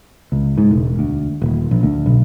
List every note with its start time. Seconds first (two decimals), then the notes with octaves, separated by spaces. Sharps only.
0.32 C#2
0.58 G#2
0.71 E1
0.99 D2
1.42 D#1
1.71 A#1
1.83 D2
2.06 B1